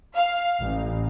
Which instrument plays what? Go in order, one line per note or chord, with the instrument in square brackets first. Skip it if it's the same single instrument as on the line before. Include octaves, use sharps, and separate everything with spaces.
[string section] F5
A1